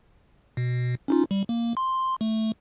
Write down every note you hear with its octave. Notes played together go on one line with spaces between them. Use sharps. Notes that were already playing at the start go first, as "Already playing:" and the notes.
B2
C#4 D#4 F4
G3
A#3
C6
A3